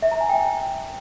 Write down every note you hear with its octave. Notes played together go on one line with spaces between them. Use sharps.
E5
A#5
G#5
G5